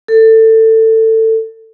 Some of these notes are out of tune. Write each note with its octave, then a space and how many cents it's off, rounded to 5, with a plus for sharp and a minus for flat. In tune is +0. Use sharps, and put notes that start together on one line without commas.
A4 +20